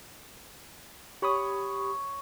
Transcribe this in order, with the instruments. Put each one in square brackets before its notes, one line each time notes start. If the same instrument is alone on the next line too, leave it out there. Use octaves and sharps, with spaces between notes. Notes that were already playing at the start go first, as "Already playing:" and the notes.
[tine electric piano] G4 B5 D#6 [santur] C#5